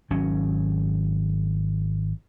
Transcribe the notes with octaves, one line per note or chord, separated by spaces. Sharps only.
G#1 F#3 C#4